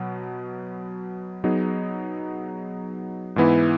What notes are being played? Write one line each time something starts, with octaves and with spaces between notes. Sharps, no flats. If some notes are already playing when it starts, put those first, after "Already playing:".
Already playing: B2 F#3 B3
F#3 B3 D#4 G#4
G#2 E3 B3 E4